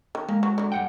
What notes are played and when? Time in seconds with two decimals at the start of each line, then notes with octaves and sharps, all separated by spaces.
0.15 D#3
0.29 G#3 A#3
0.43 F#3
0.58 D3 F#3
0.72 G2 F#5 G5